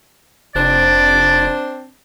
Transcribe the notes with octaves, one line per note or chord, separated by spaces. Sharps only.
F1 C4 D4 C5 D5